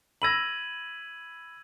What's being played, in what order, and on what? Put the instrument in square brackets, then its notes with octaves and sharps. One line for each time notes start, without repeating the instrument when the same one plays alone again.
[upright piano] B5 E6 A#6 [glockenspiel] G#6 D#7 F#7